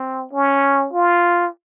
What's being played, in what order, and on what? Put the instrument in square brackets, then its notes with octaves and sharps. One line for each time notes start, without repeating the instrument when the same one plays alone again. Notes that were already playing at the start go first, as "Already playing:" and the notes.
Already playing: [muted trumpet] C4
C#4
F4